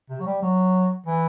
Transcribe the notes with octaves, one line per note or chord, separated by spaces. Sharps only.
C3
F#3
G3
F#3
E3